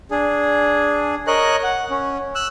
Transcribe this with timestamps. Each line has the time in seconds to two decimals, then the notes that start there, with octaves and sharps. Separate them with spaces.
0.11 D4 G#4
1.27 A#4 C#5 D#5 F#6
1.63 F#5
1.91 C#4
2.35 E6 F#6